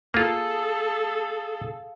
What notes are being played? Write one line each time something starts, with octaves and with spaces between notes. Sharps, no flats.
A#3 F4 G#4 A4 F5